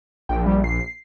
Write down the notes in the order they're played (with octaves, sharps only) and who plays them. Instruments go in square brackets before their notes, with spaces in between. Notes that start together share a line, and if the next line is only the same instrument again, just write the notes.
[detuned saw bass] A#1 [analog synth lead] G5
[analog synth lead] G3
C7